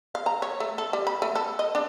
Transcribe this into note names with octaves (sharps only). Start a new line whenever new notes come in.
F5
A#5
C#5
A3
A4
G3
B5
A3
A4
D#5
D4